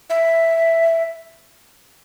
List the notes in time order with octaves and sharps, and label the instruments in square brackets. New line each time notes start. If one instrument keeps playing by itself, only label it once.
[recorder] E5